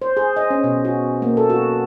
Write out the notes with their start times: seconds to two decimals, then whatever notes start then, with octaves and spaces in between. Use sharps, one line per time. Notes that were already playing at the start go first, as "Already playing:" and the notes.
0.02 C5
0.17 G#4
0.37 D#5
0.50 C#4
0.64 B2
0.85 F#4
1.22 A#3
1.37 A4
1.50 F#4